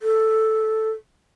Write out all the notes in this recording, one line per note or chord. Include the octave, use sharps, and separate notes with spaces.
A4